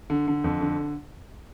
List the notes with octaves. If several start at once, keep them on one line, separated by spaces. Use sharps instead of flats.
D3
D3
F2
D3